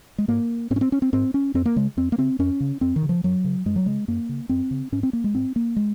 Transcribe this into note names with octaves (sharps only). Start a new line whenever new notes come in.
G#3
G#2 A#3
G#2 C4
C#4
C4
C#4
C4
G#2 C4
C#4
F2 C4
A#3
C#3 G#3
F2 C4
A#3
C#3 C4
F2 C#4
C#3
F2 C4
D#3
C#3
F3
F#2 F#3
C#3
F#2 G#3
F#3
C#3 G#3
F#2 A#3
C#3
F#2 C4
C#3
G#2 C#4
C4
A#3
G#3
G#2 C4
A#3
G#3